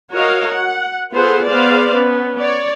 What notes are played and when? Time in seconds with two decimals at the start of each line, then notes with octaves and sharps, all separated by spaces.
0.12 F#4 A#4 C#5 D#5 F5
0.52 F#5
1.12 B3 F4 G#4 A4 C5 F#5
1.47 B3 G#4 B4 C5 D5 F5
1.92 B3 C#4
2.39 C#5 D5